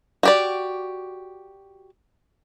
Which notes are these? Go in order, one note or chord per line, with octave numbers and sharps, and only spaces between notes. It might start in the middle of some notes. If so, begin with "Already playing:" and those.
F#4 G4 D5